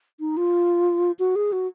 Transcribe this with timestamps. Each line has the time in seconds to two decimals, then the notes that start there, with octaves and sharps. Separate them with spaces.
0.20 D#4
0.37 F4
1.19 F#4
1.36 G#4
1.52 F#4